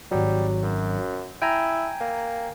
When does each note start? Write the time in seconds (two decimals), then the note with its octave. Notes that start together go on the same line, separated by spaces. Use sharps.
0.11 G#1 F#3 G3
0.63 F#2
1.42 E4 G5 G#5 A#5
2.01 A#3